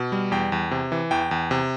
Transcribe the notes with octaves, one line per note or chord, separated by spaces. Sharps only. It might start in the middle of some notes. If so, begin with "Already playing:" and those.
Already playing: B2
G3
E2 G5
E2
C3
E3
E2 G5
E2
C3